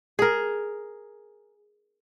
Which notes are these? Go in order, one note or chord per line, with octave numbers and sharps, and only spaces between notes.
G#4 A#4